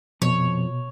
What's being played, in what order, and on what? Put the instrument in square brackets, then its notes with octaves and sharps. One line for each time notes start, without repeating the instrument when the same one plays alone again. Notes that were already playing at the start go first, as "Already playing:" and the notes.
[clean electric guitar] F2 F3 [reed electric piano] B2 [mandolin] C#5